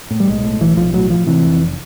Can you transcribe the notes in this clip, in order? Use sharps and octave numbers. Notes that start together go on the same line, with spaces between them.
A2
G3
B1 G#3
A2
B1 E3
B1 F3
A2 F#3
A2 F3
C3 E3
F1